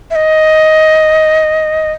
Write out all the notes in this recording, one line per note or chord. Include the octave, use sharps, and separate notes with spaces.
E5
D#5